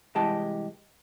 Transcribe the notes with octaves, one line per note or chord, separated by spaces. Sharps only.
C2 E3 G#3 G4 A5